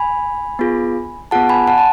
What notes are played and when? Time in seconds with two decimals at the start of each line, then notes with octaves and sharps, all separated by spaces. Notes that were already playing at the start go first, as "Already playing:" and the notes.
Already playing: G#5 B5
0.59 B3 F4 G#4
1.31 B3 F4 G#4 F#5 A5
1.49 G#5 B5
1.67 F#5 A5
1.78 A5